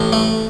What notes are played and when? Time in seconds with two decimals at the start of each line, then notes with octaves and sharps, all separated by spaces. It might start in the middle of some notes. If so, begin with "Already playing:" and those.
Already playing: A1 A2
0.13 A3